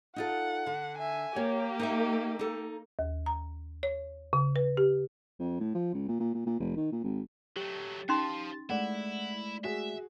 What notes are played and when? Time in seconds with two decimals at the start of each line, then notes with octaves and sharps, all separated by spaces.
0.16 D#4 F4 A4 F#5
0.66 D3
0.98 E5 G#5
1.36 A#3 G4 C#5
1.79 D#4 D#5 E5
2.39 D#4 A4
2.99 D#2
3.26 A#5
3.83 C#5
4.33 C#3
4.56 B4
4.77 G4
5.39 F2
5.60 A2
5.74 F3
5.94 C#2
6.08 A#2
6.20 A#2
6.34 A#2
6.46 A#2
6.60 F1
6.77 D#3
6.92 A#2
7.04 G#1
7.56 F#3 A3 G4
8.09 C#4 D#4 F5 A5 C6
8.70 G#3 A3 E4 D5 F#5
9.64 F#4 G#4 E5